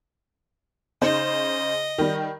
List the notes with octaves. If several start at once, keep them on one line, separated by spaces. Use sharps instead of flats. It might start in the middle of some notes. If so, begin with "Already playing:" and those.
C#3 D#4 C5 D#5
D#3 G3